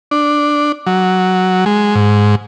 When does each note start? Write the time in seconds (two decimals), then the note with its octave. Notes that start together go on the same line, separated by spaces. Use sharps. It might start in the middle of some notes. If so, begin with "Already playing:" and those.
0.11 D4
0.86 F#3
1.66 G#3
1.95 G#2